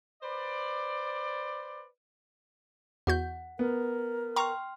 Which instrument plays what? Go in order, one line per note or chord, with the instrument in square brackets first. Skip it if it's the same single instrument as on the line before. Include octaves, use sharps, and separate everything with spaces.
[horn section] B4 C5 D5
[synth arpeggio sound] E2 F#4 G6 [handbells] F#5
[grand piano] B3 [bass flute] A#4
[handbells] G5 C6 F6 [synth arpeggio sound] A#5 C#6